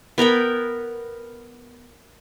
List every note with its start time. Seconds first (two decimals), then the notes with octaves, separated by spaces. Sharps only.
0.18 B3 A#4 G5 B5